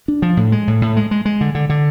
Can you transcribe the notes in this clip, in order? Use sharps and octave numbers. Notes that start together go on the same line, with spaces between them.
D4
F3
A2
G#3
A2
A2
G#3
G#3
G#3
D3
D3
D3